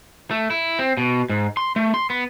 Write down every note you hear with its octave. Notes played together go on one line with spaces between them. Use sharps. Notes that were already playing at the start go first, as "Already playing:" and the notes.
A3
E4
C4
B2
G#2
C6
A3
C6
B3